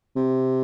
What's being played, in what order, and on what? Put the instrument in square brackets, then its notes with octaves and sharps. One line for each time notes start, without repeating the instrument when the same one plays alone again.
[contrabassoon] C3